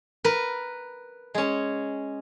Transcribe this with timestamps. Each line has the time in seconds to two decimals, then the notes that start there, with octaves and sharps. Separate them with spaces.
0.25 A#4 B4
1.35 G#3 C#4